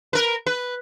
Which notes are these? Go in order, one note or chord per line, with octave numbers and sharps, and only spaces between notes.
A#4 B4
B4